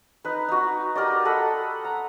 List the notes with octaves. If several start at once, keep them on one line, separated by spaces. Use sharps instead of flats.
D#4 B4
D#4 F#4
G4 A#4 D5 D#5
A4 D#5 F#5 B5
A#5